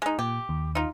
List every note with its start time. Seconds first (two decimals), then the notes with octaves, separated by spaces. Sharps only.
0.02 G#3 D#4
0.19 A#2 G4
0.49 D#2
0.75 D#4 F4